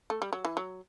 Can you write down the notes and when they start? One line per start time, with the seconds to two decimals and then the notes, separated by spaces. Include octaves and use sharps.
0.10 A3
0.22 G3
0.33 F#3
0.45 E3
0.57 F#3